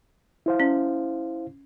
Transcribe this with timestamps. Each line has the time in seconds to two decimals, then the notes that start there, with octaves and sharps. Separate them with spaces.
0.46 E4 C5 F5
0.60 C#4